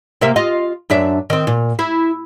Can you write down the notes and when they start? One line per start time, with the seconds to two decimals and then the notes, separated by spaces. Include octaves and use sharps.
0.21 C3 A#3 E5
0.36 F4 D#5
0.90 F#2 D4 E5
1.30 D#3 C4
1.47 A#2
1.79 E4